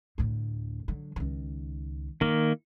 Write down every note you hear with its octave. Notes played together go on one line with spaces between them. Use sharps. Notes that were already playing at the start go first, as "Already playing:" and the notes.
D2 A2
D3 F#3
C#2 D#3
D#3 A#3 E4